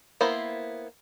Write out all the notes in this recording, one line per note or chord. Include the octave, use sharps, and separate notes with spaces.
A#3 B3 E4 C5